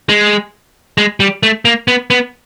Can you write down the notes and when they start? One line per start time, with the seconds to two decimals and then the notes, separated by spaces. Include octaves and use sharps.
0.09 G#3
0.98 G#3
1.20 G3
1.43 A3
1.65 A#3
1.88 B3
2.10 B3